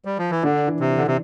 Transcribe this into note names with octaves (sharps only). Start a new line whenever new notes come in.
G3
F3
E3
D3 D4
E3
C3
E3
D3
C3